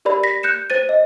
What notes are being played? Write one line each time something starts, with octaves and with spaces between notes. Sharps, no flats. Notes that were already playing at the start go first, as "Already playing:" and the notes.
G4 A#4 D5 B5
A#6 B6
F#6 G6 C#7 E7
C5 A6 D#7
D#5